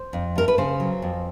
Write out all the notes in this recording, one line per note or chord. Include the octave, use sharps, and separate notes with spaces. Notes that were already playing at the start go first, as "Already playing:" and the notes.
Already playing: C5
F2
A3 A#4
B4
C#3 C5
F#3
F2